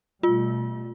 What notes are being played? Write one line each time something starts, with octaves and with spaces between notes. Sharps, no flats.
B2 G3 A3 F4